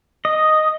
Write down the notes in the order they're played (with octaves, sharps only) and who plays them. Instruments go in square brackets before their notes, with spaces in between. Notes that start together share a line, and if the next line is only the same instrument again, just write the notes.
[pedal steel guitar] D#5